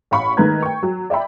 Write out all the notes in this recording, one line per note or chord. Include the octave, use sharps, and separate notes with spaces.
A1 F5 B5 C#6
D#3 G#3 A3 B4 A#5 G#6
G5 C#6
F#3
D5 E5 G5 B5